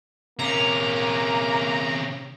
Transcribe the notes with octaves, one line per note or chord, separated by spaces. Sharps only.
C3 A#3 C#4 A#5